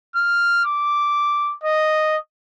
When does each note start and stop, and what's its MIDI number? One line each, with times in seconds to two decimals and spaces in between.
0.15 0.61 89
0.64 1.53 86
1.63 2.16 75